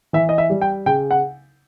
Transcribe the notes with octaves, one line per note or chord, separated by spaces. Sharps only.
E3 E5
D#5
E5
G3
G5
C#3 G5
F#5